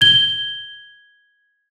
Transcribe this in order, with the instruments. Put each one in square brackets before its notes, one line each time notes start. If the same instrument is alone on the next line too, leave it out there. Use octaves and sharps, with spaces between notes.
[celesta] G#6 G7